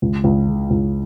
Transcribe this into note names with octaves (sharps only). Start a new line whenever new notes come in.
C#2
C#2
C#3
C#2